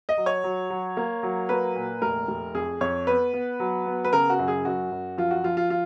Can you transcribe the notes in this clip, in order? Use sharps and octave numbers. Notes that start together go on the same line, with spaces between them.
D#5
F#3
C#5
F#3
F#3
A#3
F#3
A#3 B4
A#2
F1 A#4
F1
F2 G#4
F2 C#5
B3 B4
B3
F#3
B3
B4
C#3 A#4
F#4
F#2
G#4
F#2 F#4
F#2
F3 F4
F#4
F3 F4
F4
F4